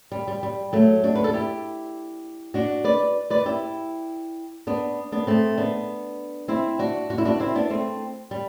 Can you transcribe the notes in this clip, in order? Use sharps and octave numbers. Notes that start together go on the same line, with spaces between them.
G3
G3
G3
F#3 A3
D4 F#4
B4
A4
E4 G4
D4 F#4
B4 D5
B4 D5
E4 G4
B3 D4
B3 D4
A3 C4
B3 D4
C4 E4
D4 F#4
F#4
E4
D4 F#4
C4 E4
B3 D4
A3 C4
G3